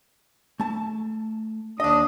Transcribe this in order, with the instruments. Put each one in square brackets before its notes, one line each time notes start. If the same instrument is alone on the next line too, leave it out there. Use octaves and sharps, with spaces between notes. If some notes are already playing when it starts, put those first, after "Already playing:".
[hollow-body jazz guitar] A3 A5
[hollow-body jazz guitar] D#2 D#5 [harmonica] D4 D#6